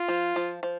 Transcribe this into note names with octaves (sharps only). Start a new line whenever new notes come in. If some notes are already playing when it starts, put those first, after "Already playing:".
Already playing: F4
F3
F3
F3